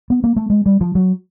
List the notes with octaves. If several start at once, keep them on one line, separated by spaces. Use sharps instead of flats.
B3
A#3
A3
G#3
G3
F3
F#3